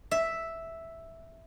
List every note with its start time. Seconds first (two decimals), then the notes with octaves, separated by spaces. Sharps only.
0.11 E5